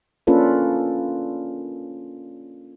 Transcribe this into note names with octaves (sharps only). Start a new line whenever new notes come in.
A#3 C#4 D4 F4 A4 B4